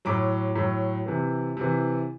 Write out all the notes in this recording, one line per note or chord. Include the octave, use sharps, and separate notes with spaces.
A2 F#3 D6
A2 F#3
C3 E3
C3 E3